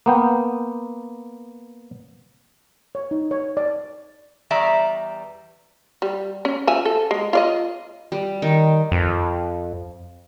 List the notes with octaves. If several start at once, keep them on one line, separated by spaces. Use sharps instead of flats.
A#3 B3 G5
C#5
D#4
C#5
D5
E2 G3 D5 E5 A#5
G3
C#4
F3 E5 G#5
A4
G#3
F4 D5 D#5
G3
D#3
F2